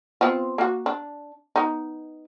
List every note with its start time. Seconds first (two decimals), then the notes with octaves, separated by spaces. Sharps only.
0.21 B3 C4 F4
0.58 A#3 F#4
0.86 D4
1.56 B3 D#4